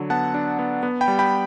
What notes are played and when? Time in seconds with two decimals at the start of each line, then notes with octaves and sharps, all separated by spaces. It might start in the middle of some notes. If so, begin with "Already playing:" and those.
Already playing: D3 F#3
0.10 B3 F#5 A5
0.34 D4
0.59 B3
0.83 B3
1.01 G5 B5
1.08 G3
1.19 G5 B5